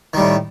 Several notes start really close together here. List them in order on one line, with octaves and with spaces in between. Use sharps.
D#3 G3 A2